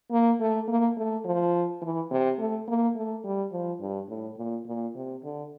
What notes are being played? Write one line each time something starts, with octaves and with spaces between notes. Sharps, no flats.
A#3
A3
A#3
A3
F3
E3
C3
A3
A#3
A3
G3
F3
G2
A2
A#2
A#2
C3
D3